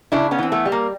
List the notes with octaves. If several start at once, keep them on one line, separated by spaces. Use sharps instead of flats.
C#3 D4 E4
B3 C#4
E3 C4
A3 B3
G3
A#3